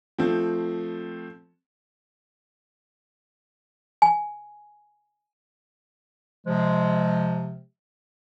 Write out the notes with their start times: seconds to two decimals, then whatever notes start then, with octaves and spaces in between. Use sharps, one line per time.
0.18 F3 A3 C4
4.02 G#5
6.45 C3 F3 G#3